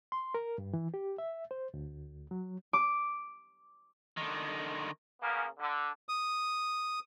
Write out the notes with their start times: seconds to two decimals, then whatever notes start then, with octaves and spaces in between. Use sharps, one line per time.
0.12 C6
0.34 A#4
0.58 G2
0.74 E3
0.94 G4
1.18 E5
1.51 C5
1.74 D2
2.31 F#3
2.73 D6
4.17 D3 D#3
5.21 C#3 A#3 B3 C#4
5.58 D3
6.09 D#6